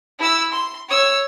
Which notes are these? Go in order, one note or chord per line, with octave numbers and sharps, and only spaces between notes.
E4 E6
C6
C#5 E6